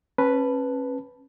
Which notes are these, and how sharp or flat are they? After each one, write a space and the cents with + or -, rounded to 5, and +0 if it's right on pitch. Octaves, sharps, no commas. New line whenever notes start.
C#4 -30 B4 +0 A5 +0